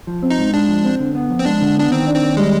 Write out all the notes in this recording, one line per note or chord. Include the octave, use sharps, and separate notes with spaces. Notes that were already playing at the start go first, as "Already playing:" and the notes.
F3
C4
D#4
G#2
G#3 D4
F3
C4
D3
B3
F2
C4
G#3 D4
D3
B3 D4
D#3 C4
D4
C4
D#2
G3 G#3